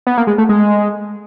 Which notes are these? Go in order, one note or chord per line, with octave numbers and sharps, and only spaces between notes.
B3
A#3
G#3
A3
G#3